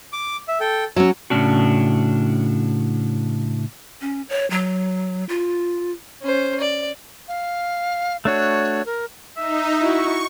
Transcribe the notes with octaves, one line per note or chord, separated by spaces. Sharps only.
D6
E5
A4 G5
F#3 C#4 E6
A2 C#3 G3 C#4 D4 F#4
C#4
C#5
F#3
F4
C#4 C5
D5
F5
A3 D4 F#4 C#5
A#4
D#4 E5
E4 F#4 C#6